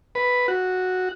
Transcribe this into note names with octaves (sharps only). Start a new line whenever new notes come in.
B4
F#4